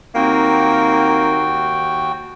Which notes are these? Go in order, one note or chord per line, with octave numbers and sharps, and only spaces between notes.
D#2 A#3 C4 D#4 F#4 G5